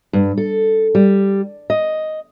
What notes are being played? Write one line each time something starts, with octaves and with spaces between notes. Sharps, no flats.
G2
A4
G3
D#5